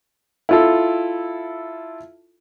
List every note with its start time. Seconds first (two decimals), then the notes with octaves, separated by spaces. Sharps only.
0.49 E4 F4 A4